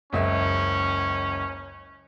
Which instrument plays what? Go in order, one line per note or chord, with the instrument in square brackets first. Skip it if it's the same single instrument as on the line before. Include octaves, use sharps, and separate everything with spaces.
[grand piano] F#1 C#2 E5 [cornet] C#4